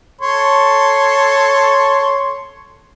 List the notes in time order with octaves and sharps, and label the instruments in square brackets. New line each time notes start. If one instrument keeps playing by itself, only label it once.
[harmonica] A4 C#5 C6